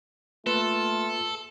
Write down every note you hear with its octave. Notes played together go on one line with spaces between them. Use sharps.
A3 A#3 F4 A4 B4